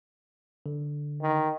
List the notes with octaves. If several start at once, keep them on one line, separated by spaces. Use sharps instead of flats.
D3
D#3